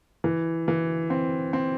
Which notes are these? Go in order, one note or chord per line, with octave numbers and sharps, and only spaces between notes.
E3
E3
C4
C4